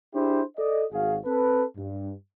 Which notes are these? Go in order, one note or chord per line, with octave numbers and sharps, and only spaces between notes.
D4 E4 G4 G#4 C5
A4 D5 D#5
G#1 F#4 G#4 F5
C4 A4 B4
G2